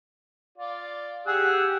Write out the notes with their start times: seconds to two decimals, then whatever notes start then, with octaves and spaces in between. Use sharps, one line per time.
0.58 F4 D5
1.27 G4 G#4 F#5 E6 F#6